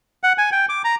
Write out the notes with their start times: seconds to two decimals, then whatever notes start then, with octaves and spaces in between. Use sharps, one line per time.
0.24 F#5
0.38 G#5
0.52 G5
0.69 D6
0.85 A#5